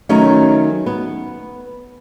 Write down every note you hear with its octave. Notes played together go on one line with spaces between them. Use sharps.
D#3 F#3 A3 B3 C#4 D#4
B3